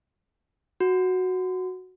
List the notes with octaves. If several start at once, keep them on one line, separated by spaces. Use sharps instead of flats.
F#4